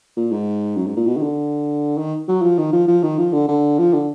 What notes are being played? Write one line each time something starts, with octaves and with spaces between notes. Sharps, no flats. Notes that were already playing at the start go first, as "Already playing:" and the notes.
A#2
G#2
F#2
G#2
A#2
B2
D#3
D3
D#3
F#3
F3
D#3
F3
F3
D#3
F3
D3
D3
F3
D3